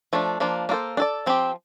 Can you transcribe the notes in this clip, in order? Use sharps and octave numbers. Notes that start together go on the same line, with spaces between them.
F3 A3 D4
F3 A#3 D4 F4
A#3 D4 F4 A4 C5
D4 A4 D5
F3 C4 G4